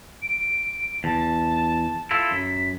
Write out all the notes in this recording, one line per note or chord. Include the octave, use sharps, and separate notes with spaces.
D7
E2 A5
E4 F4 A4
F#2 B6